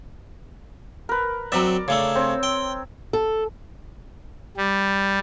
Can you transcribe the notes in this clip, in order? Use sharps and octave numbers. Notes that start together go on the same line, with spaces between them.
A#4 B4
F#3 C4 D5 E5 A#5
C#3 A3 D4 C#5 E6
C4 C#5
G5
A4
G3